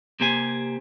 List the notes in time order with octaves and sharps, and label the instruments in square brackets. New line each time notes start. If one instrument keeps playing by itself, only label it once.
[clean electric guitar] C3 A#3 G4 C5 G#5